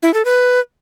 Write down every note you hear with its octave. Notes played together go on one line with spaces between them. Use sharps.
E4
A4
B4